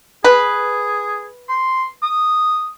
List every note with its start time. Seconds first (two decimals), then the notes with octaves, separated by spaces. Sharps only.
0.24 G#4 B4
1.49 C6
2.03 D#6